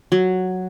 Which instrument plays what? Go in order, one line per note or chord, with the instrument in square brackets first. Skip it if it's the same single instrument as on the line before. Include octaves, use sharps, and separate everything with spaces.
[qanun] F#3